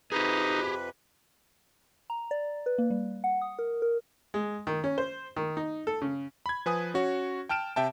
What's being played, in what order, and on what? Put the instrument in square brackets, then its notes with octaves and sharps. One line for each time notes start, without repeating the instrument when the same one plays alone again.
[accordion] F2 C3 B4 [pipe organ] D#4 [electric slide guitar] G4 G#4
[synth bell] A#5
D5
B4
A#3
G3
F#5
D#6
A#4
A#4
[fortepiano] G#3
D#3
C#4
C5
D#3
D#4
A4
C#3
[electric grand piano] B5 G#6
F3 B4 G#5 D#6
C#4 F#4 C#5
G5 A5 F6 D7 E7
C3 E5 G5 A5